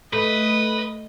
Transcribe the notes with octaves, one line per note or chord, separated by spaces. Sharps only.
A3 B4 D#5 D#6